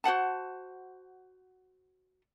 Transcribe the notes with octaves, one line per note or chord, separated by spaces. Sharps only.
F#4 C5 F#5 A5